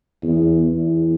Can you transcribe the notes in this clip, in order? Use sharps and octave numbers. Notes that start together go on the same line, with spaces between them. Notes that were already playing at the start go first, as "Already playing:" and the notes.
E2
E2